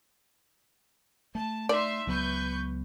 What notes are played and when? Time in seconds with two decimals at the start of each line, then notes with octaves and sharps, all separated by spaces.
1.35 A3 A5
1.69 D#4 D5 E5 C6
2.07 C#2 F#3 B3 B4 C#6 G6